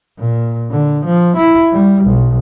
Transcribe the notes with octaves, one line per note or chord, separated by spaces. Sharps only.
A#2
D3
F3
E4
G3
B1